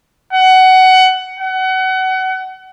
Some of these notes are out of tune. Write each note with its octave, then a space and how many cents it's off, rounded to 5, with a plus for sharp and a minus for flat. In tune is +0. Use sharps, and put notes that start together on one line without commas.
F#5 +20
F#5 +30